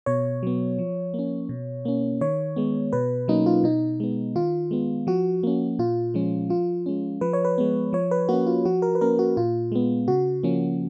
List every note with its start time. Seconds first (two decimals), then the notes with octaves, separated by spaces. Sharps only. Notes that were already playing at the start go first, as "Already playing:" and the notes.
0.06 B2 C#5
0.43 F#3 B3
0.79 F3
1.14 A#3 C#4
1.49 B2
1.85 A#3 C#4
2.21 D#3 C#5
2.56 G#3 B3
2.93 B2 B4
3.28 F#3 A#3 C#4 D#4
3.46 F4
3.64 B2 D#4
4.00 G#3 B3
4.35 D#3 F4
4.71 G#3 B3
5.07 F3 F#4
5.43 A#3 C#4
5.79 A#2 F4
6.14 F3 G#3 C#4
6.50 F3 F4
6.86 G#3 C#4
7.21 F3 B4
7.33 C#5
7.45 B4
7.58 G#3 B3
7.93 F3 C#5
8.11 B4
8.29 A#3 C#4 F#4
8.46 F4
8.65 F3 F#4
8.82 A#4
8.95 B4
9.01 A#3 C#4 A#4
9.19 F#4
9.37 A#2 F4
9.72 G#3 B3
10.08 C#3 F#4
10.43 F3 A#3 C#4